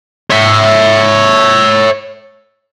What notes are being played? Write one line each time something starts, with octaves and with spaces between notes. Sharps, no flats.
C#5 E5